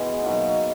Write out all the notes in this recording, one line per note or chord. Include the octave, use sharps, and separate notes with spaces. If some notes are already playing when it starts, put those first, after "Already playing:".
Already playing: B2 E3 G#3 B3
B2 F#3 A#3 D#4